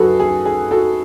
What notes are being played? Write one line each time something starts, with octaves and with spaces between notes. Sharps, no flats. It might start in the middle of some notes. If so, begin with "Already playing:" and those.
Already playing: F#2 C#3 F#3 F#4 G#4 A4 B4
G#4
G#4
F#4 A4